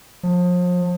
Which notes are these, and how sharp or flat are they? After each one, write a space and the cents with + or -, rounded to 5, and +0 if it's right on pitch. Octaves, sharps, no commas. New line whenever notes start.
F3 +35